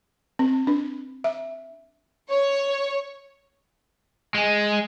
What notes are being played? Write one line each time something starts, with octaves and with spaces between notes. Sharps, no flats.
C4
D4
E5
C#5
G#3